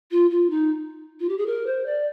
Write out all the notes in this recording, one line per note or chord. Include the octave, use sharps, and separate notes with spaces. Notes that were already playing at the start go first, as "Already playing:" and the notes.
F4
F4
D#4
F4
G4
G#4
A#4
C5
D5